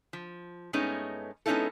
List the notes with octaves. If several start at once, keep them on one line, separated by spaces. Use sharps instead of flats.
F3
G2 G#3 A3 B3 C#4 D#4
G#3 B3 C#4 D#4 E4 A4